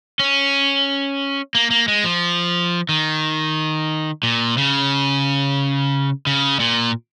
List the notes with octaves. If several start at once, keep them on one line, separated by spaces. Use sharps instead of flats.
C#4
A#3
A#3
G#3
F3
D#3
A#2
C#3
C#3
A#2